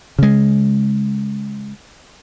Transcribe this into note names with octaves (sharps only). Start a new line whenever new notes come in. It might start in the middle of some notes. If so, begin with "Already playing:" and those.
C#3 G#3